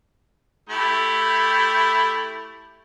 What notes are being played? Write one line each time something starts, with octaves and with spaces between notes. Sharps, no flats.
A3 E4 G4